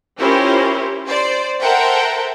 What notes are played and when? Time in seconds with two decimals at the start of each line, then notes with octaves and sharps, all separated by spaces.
0.18 C#4 E4 F4 G4 A#4 C5
1.08 C5 D5
1.61 A4 A#4 C5 E5 F#5 G5